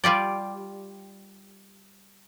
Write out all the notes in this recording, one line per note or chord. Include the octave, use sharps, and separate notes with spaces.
G3 F4 G4 D5